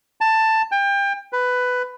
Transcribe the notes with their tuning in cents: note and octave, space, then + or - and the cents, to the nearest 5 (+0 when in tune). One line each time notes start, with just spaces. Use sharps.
A5 +10
G5 +30
B4 +10